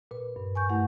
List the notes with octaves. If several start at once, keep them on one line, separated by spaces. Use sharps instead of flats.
A#2 B4
G2
G#5 C#6 G6
G2 A3 E4 F#5